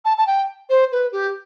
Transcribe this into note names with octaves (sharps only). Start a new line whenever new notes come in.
A5
A5
G5
C5
B4
G4